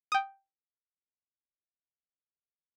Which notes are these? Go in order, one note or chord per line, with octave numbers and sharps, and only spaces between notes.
G5 D#6